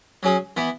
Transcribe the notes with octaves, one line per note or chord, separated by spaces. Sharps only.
F#3 C#4 G#4
E3 B3